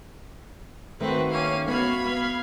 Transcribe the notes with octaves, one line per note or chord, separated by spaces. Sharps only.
D#3 A3 C4 F#4 B4
A#3 C#4 F5 D#7
B3 F#4 F5 B5 G#6
B3 F5